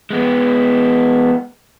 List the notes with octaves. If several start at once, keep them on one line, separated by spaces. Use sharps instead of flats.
G#3 B3